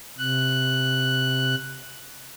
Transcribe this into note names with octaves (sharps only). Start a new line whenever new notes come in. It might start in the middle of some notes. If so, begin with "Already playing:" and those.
C3 F#6